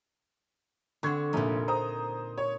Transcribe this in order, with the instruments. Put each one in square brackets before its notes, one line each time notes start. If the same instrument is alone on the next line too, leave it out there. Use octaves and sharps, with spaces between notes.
[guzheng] D3 C4 [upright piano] C#6 G#6
[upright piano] F1 A#1 [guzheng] A#2 D#4
[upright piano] C5 A#5 D#6
C#5